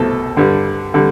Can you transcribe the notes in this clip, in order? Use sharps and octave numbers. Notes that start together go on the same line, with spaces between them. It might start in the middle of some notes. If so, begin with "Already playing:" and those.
Already playing: C2 B2 A3 A4
G2 D3 G3
D3 G3